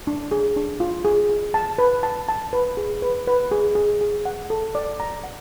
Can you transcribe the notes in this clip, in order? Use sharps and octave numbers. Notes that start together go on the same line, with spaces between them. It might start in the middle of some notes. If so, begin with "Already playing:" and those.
D4
G#4
D4
F4
G#4
G#4
A5
B4
A5
A5
B4
G#4
B4
B4
G#4
G#4
G#4
F#5
A4
D5
A#5
F#5